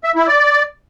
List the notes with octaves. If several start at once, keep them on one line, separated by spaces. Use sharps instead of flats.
E5
E4
D5